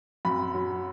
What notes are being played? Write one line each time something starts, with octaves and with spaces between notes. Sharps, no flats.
F#2 B5
F#3